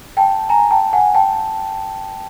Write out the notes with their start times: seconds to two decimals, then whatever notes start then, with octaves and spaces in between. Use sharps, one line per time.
0.17 G5 A5
0.49 G#5 A#5
0.71 G5 A5
0.93 F#5 G#5
1.15 G5 A5